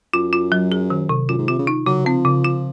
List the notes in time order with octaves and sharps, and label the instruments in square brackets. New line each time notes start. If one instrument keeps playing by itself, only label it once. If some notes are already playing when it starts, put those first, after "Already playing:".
[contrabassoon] F#2 [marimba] F4
[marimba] F4
F#3
G#4
D#3
C3
[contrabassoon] F#2 [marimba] F4
[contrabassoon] G#2
[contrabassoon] C3 [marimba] F4
[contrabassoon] C#3
[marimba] D#4
[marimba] C#3 [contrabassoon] F#3
[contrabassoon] F3 [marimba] C4
[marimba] C#3
F4